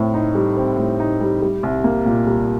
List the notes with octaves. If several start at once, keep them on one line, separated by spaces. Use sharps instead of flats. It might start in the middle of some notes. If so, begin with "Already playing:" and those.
Already playing: A2 C4
D#4
G3
C4
A2
D#4
G3
G3
C2
A#3
A#2
G3